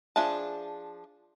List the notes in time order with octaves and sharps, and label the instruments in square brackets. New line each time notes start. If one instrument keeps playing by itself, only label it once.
[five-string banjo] F3 D4 G#4 E5 A5